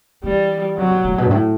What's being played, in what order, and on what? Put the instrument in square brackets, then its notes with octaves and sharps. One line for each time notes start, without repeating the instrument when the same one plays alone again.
[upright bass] E3 [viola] G3
[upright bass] C3 [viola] F#3
[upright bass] B2
A2
B2
G2
A2